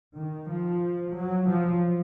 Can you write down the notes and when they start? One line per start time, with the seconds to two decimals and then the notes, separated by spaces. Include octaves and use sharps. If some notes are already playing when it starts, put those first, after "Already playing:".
0.18 D#3
0.51 F3
1.16 F#3
1.48 F3